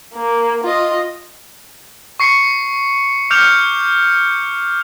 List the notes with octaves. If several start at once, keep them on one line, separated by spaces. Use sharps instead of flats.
A#3
F4 D#5
C#6 C7 C#7
D6 F6 G6 C#7 F7